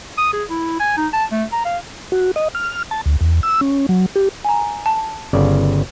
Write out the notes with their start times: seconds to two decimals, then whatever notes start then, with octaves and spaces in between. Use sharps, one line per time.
0.18 D#6
0.33 G#4
0.49 E4
0.80 G#5
0.97 D#4
1.13 A5
1.32 A3
1.52 A#5
1.65 F5
2.12 F#4
2.36 D#5
2.55 F6
2.91 A5
3.06 D2
3.21 E2
3.43 E6
3.61 C#4
3.89 F#3
4.16 G4
4.45 G#5 A#5
4.86 A5
5.33 G1 C#3 D5